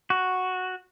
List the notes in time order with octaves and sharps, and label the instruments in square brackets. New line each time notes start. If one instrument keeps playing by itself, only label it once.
[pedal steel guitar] F#4